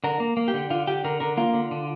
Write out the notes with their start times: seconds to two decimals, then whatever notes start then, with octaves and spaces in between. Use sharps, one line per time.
0.04 D3 A#4
0.20 A#3
0.37 A#3
0.48 G4
0.54 D3
0.70 D3 F4
0.87 D3 G4
1.04 D3 A#4
1.20 D3 A#4
1.37 A#3 F4
1.54 D3
1.71 D3